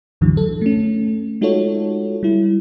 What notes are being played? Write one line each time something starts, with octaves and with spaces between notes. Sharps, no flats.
C#2 F#2 A2 D3 E3 F#3
A2 A4
A3 C#4
G#3 D#4 F4 F#4 A4 C#5
G3 E4